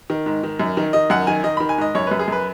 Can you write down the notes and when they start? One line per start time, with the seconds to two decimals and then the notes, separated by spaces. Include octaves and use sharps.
0.10 D#3
0.26 G#2
0.43 D#3
0.60 F#2
0.77 D#3
0.93 D#3 D#5
1.10 F#2 F#5
1.27 D#3 G#5
1.44 D#3 D#5
1.57 D#3 B5
1.69 G#5
1.78 G#2 D#5
1.95 F#2 C#5
2.07 F#2 B4
2.19 G#4
2.28 F#2 B4